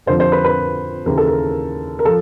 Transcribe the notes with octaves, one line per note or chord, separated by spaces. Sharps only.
F2 D3 F3 C5
C5
B4
B4
D#2 C#3 E3 A#4
A4
A#4
A#4
F3 A4